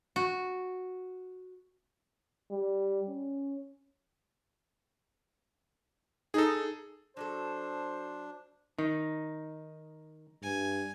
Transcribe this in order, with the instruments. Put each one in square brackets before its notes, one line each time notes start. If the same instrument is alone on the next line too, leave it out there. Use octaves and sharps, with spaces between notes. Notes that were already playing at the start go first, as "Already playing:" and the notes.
[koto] F#4
[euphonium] G3
C#4
[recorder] D#4 [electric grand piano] G#4 A4
[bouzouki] F#3 F#4 A4 [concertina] D4 [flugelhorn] C5
[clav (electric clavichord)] D#3 [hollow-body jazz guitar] D#4
[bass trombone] G2 [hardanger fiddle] G#5